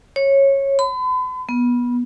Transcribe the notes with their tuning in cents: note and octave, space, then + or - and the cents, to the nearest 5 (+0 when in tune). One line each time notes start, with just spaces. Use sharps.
C#5 -15
B5 +45
B3 -20